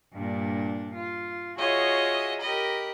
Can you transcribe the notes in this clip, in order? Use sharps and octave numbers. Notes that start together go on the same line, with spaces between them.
G2 A#2 D4
F4
F4 F#4 G#4 C#5 D#5 E5
G4 A#4 D#5 B5